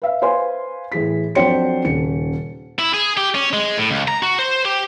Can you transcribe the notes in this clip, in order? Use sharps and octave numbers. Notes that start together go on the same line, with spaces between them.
B4 E5 F5
B4 C5 F5 G#5 C6
A2 E3 G#4 B6
F2 F#3 D4 C5 G5 C#7
D#1 C#3 C#7
E4
G#4
G4
C#4
G#3
A2
C#2
A#5
F#4
C5
G4